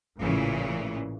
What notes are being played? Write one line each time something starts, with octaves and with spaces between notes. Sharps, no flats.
A1 A#2 C#3 E3